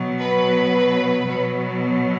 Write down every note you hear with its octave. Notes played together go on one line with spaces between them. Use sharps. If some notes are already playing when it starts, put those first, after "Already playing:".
Already playing: B2 F#3
B4
B2 F#3